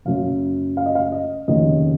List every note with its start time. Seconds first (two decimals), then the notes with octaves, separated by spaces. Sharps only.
0.05 F#1 F#2 C#3 F5
0.77 F5
0.86 D#5
0.95 F5
1.12 D#5
1.48 F1 D#2 C#3 D#5